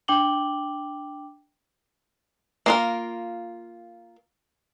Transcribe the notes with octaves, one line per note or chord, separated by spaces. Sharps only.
D4 G5 D6 F#7 G7
A#3 F4 A#4